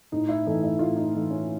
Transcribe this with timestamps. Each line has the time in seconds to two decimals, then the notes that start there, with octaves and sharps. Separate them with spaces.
0.12 A2 D#4
0.29 E4
0.46 E3 A3 D#4
0.63 E4
0.79 A2 F4
0.96 D#4
1.14 E3 A3
1.30 C#4